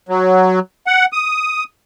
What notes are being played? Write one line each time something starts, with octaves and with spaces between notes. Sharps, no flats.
F#3
F#5
D#6